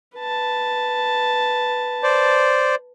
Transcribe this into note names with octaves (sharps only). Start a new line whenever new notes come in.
B4 A5
C5 D5